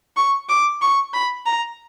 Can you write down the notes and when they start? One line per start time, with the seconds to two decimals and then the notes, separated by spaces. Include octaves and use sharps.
0.17 C#6
0.49 D6
0.82 C#6
1.14 B5
1.46 A#5